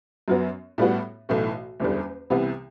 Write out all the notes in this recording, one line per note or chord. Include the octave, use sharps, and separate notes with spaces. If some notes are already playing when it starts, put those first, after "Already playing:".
F#2 F#3 B3
A2 G3 B3 F#4
B1 A2 E3 A3
F#1 E2 D3 G3
C2 C3 E3 B3